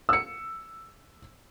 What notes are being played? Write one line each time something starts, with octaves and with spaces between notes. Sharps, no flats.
E6 C#7